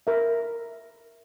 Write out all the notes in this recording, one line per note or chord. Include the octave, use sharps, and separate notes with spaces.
A#4 E5